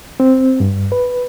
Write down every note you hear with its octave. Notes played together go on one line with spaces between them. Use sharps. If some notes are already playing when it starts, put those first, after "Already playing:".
C4
G2
B4